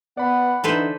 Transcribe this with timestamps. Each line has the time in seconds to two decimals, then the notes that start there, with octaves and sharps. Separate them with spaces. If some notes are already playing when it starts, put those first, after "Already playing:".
0.17 B3 D5 F#5 B5
0.64 D3 E3 D#4 A4 B4 C5